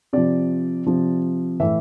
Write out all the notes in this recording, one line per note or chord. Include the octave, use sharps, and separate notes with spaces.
C3 F3 D5
C3 F3
A2 E3 E5